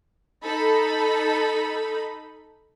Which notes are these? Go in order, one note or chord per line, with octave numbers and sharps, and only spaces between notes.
D#4 A4 B5